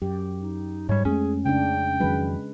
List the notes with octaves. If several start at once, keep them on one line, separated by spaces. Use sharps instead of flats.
F#2 G4
D#4
G#2 G3 C#5
F2 G#3 A3 C#4 G#4
C#3 D4 G5
F2 D#3 F#3 G#3 B4